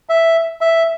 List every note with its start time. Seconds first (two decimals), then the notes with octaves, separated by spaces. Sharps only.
0.09 E5
0.61 E5